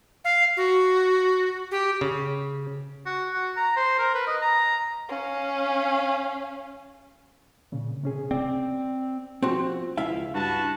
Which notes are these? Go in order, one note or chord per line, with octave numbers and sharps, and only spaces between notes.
F5
F#4
G4
C#3
F#4
F#4
A#5
C5
A#4
B4
D#5
A#5
C#4 F5
A#2 C#3
C3 C#4 G#4
C4 D5
F3 C4 F#4
C#2 E4 E5 F5
G2 F#4 B4 A5